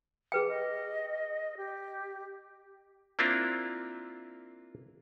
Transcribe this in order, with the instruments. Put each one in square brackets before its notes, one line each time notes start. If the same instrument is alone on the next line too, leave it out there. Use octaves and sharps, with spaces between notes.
[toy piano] G#4 B4 G5
[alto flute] D#5
G4
[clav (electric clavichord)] A#3 C4 D4 E4 F4